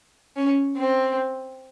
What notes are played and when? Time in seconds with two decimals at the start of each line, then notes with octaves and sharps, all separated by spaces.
0.36 C#4
0.77 C4